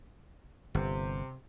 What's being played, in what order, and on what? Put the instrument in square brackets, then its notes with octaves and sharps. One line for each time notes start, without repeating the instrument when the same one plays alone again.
[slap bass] G1 [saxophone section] C3